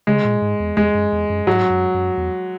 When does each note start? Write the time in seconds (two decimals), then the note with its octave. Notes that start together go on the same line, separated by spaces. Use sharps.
0.07 C#3 G#3
0.24 A#2
0.42 G#2
0.60 E2
0.77 E2 G#3
0.94 F#2
1.12 E2
1.29 F#2
1.47 G#2 F#3
1.70 F#2
1.94 F#2
2.17 E2